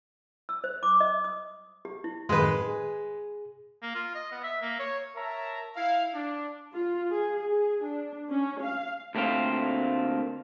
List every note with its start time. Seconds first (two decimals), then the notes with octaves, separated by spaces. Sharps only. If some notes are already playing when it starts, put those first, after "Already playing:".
0.49 E6
0.64 C5
0.83 D6
1.00 D#5
1.24 D#6
1.85 G4
2.04 E4
2.29 F#2 A2 D#3 G#3 B4
2.62 G#4
3.82 A#3
3.95 F4
4.15 D#5
4.32 B3
4.44 E5
4.62 A#3
4.79 C#5
5.15 A#4 C#5 E5 A5 A#5
5.76 E4 F5
6.13 D4
6.73 F4
7.11 G#4
7.42 G#4
7.84 D4
8.31 C#4
8.61 F5
9.15 D2 A3 A#3 C4 F4